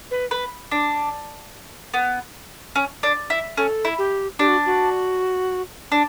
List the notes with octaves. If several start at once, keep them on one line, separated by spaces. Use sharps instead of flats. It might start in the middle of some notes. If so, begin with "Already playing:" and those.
B4
B4
D4
B3
C#4
D4
E4
C#4 A4
E4
G4
D4 G4
F#4
F#4
D4